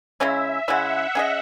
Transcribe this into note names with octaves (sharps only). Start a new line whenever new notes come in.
C#3 G#3 C#4 E4 E5
C#3 G#3 C#4 E4 F#5
C#4 G#4 D#5